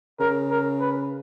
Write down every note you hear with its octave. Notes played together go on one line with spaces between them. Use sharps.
C#3 A#4
A#4
B4